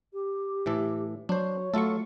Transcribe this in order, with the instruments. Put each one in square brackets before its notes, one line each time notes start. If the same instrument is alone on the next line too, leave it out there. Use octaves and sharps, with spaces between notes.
[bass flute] G4
[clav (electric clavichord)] A2 E3 A4
[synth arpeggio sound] F#3 [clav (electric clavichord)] D4 C5 [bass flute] C#5
[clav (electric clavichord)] F#3 F4 A4 [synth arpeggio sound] A3 C#6